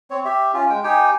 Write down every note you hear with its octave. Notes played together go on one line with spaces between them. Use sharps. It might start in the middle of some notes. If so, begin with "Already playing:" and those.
C4 C#5
G4 E5
C#4 F4
G#3 G5
D#4 G4 G5 G#5